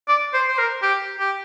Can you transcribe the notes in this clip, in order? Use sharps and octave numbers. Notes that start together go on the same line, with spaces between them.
D5
C5
C5
A#4
G4
G4